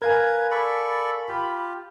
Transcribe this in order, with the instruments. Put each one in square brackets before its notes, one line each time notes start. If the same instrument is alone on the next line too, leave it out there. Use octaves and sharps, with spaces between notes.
[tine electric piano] A#4 F5 G#5 [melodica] B4 A#5 [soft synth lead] G#6
[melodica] A4 D5 C#6 [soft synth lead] B5
[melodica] F4 G4